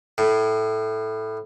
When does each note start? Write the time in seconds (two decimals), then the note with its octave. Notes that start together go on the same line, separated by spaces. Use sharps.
0.18 A2